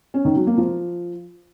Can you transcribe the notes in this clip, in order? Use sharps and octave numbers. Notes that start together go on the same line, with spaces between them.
C#4
D#3
F#3
A#3
F3